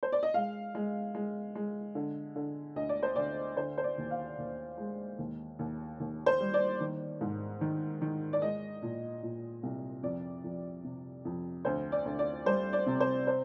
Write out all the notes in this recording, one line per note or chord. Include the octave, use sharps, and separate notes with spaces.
C5
D5
D#5
G#3 F5
G#3
G#3
G#3
D3
D3
D2 D#5
D5
C5
D2 D5
D3 C5
C5
D5
D#2
F5
D#2
G#3
D#2
D#2
D#2
C5
G3
D5
D#3
G#2
D#3
D#3
D5
G#3 D#5
A#2
A#2
C2
F2 D5
F2
C3
F2
D2 C5
D5
D2
D5
G3 C5
D5
C3
C5
C5